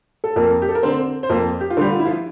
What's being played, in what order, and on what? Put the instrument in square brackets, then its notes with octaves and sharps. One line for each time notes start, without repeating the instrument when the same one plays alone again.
[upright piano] A4
F2 A#3 A#4
G4
A4
A#4
D3 C4 C5
C5
F2 A#3 A#4
G4
F4
D3 G3 G4
F4
E4
F3 F4